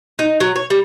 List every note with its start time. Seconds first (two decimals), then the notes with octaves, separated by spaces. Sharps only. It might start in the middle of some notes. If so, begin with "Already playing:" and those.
0.19 D#4
0.40 F#3
0.56 C#5
0.70 G3